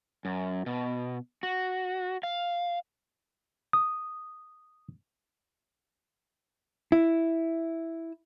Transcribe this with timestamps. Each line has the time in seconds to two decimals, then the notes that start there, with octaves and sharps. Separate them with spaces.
0.25 F#2
0.66 B2
1.43 F#4
2.23 F5
3.73 D#6
6.92 E4